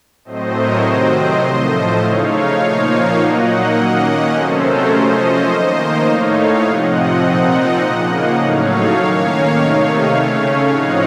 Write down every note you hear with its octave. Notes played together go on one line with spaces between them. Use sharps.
A2 F#3 A3 C4 C5 D#5
A#4 C#5
C3 D#3 F#3 C4 C5 D#5
A2 F3 A3
C#3 A3 D#4 C#5 F5
A#2 F3 A#3 D#4
A#2 F#3 A#3 D#4 D#5 F#5
D#3 A#3 C#4
C3 F#3 A3 C#4 A4 C5
A#4 C#5
F3 A3 C#4 C5 D#5
D#3 A#3 D#4
A2 A3 D#4 C#5 F5
C3 F3 C4 D#5 F#5
A#2 F3 C4 D#4
C#3 F3 A#3
A2 F#3 A3 D#4 C#5 F5
D#3 A#3 C#4
C3 D#3 A3 D#4
C#3 A3 C#4
A2 F3 C4 D#4 D#5 F#5